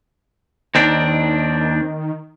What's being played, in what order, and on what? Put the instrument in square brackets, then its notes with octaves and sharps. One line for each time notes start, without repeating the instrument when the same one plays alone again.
[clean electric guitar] D#2 C4 D4 [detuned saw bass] D#3